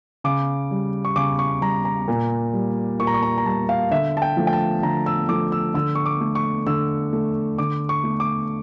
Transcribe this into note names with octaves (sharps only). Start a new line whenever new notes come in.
C#3 D6
G3
C#6
C#3 D6
C#6
G3 A#5
A#5
A#2
G3
A#2 C#6
A#5
C#6
A#5
A#5
G3 A5
F5
D3 E5
A5
G5
F3 A3
G5
A5
D3 A#5
E6
F3 A3 D6
E6
D3 E6
C#6
D6
A3
C#6
D3 E6
A3
D3 D6
C#6
A3
D6